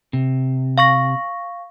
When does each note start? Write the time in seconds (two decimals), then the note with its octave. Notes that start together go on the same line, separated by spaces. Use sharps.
0.13 C3
0.78 F5 C#6 A#6